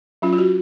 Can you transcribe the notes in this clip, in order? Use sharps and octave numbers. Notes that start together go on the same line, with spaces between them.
F#3 C#4 F4
F4
F#4